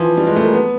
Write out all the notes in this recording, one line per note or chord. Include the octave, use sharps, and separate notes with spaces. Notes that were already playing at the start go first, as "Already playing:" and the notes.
Already playing: E3 F3
G3
G#3
A3
A#3
B3